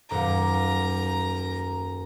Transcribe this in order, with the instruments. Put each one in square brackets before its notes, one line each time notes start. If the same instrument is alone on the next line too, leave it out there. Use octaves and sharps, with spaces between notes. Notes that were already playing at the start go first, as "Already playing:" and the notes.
[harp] D#1 F#2 D6 [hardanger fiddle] A#5